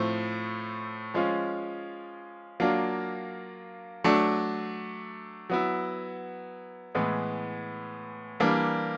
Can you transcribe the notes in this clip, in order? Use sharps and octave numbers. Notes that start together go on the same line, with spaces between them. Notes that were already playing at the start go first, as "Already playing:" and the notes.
Already playing: A2 F3 A3 C4
F3 G#3 C#4 F4
F#3 A#3 D4 F4
F#3 A3 D4
F#3 B3 E4
A2 E3 G#3 B3
E3 G3 A#3 D4